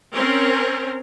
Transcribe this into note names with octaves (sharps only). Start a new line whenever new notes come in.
C4 C#4 A#4